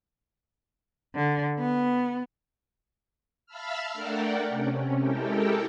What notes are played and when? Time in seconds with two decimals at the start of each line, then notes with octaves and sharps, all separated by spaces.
1.15 D3
1.58 B3
3.46 E5 F5 A5 B5 E6 F6
3.93 A3 D4 A#4 D5 F#5 G5
4.49 C3 C#4
5.01 G#3 E4 G4 A4 A#4 G5